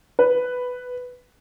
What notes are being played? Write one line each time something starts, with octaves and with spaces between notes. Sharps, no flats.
B4